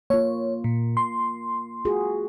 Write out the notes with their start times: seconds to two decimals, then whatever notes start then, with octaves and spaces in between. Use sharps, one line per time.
0.10 A#3 F4 C#5
0.64 A#2
0.97 C6
1.85 F4 F#4 G#4